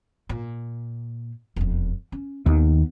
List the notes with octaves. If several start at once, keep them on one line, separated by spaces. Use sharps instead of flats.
A#2
E1 F2
C#4
D#2 D#3 B3